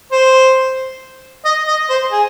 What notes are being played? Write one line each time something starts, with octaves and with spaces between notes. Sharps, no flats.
C5
D#5
D#5
C5
G#4